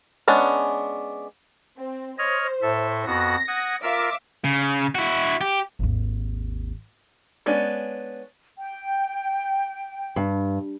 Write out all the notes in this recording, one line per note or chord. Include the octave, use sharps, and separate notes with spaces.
G#3 B3 C#4 D4
C4
C5 C#5 D#5 F6
A2 A4 E5
F2 B3 F#4 A#6
F#5 D#6 G#6
F4 A#4 E5 F5 D6
C#3
E4 F#4
G4
G#1 D#2
G#3 B3 C#4 D4
G5
G2